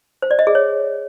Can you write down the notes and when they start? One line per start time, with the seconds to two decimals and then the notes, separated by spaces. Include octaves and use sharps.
0.22 C5
0.31 D5
0.39 D#5
0.47 G#4
0.55 C#5